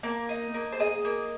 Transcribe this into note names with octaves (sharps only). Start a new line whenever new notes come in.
A#3
D#4
A#3
C5
G#4 D#5
A#3